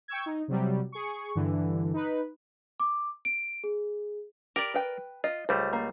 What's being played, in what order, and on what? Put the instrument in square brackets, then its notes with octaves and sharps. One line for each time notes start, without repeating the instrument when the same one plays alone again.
[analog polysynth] G5 C#6 E6 G#6
D#4
C3 F#3 G3
G#4 C#6
G2 D3 E3
D#4 B4
[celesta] D6
D7
G#4
[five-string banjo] G4 [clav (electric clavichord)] A#4 D5
[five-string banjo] B4 G5
[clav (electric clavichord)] F4 [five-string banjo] D#5
[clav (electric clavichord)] C#2 G3 A3 [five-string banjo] C5
[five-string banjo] A#3